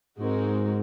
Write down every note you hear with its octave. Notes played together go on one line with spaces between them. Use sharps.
G#2 G#3 C4 D#4 F#4 A#4